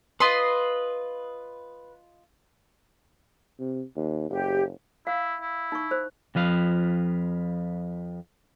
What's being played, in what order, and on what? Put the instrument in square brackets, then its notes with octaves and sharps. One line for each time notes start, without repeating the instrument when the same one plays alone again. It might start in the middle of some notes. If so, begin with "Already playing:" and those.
[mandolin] F4 D#5 C6 [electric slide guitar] B4
[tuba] C3
D#2
[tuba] F#1 [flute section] G4
[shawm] E4 [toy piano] F5
[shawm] E4
[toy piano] D#4 C#6
C5
[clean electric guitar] F2 F3 B4 F5